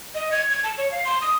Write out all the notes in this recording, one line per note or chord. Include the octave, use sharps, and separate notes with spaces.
D#5
G#6
G#6
A5
C#5
F5
C6
D#6